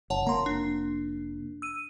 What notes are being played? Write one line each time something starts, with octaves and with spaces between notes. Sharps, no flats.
F#1 C#5 F#5 A5
F1 A#3 A#5 C6
D4
E6 D#7